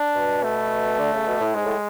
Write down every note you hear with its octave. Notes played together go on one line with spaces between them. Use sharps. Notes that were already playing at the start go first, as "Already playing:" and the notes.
Already playing: D4
B2
A3
D3
C#3
B2
A2
G#2 G#3
A2